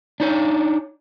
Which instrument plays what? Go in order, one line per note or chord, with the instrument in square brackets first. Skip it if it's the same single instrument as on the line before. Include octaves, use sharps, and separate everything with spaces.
[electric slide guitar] D4 D#4 C#5